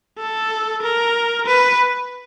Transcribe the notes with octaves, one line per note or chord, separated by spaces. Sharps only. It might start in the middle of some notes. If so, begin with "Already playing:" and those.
A4
A#4
B4